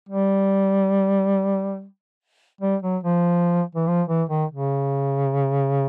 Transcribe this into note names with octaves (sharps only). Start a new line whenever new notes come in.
G3
G3
F#3
F3
E3
F3
E3
D#3
C#3